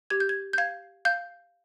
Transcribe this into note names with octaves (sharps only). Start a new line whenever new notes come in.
G4 G#6
G6
G#6
G6
F5 G#6
F5 G6